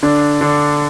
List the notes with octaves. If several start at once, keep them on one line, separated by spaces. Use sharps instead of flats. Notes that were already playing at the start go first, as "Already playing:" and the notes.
D3 D4
D3 D4